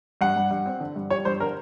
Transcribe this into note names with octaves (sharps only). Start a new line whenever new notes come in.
G2 F#5
G2
G2
C4
D3
G2
G3 C#5
G2 C5
D3 A#4